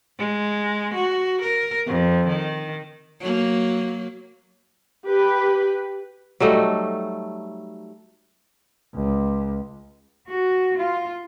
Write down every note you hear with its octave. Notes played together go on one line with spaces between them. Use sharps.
G#3
F#4
A#4
F2
D#3
F#3 A#3
G4 B4
F#3 G3 A3 D#4
C#2
F#4
F4